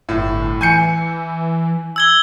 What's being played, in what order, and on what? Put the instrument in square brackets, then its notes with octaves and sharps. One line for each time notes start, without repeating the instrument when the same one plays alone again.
[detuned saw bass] G1 [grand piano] A2
[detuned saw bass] E3 [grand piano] G#5 G6 C#7
[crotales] E6 G#6 G7